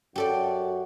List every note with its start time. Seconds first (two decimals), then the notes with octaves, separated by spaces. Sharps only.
0.16 F#2 F#4 G4 A4 D5